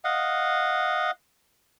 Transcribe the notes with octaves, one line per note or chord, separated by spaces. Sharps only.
D#5 F5 F#5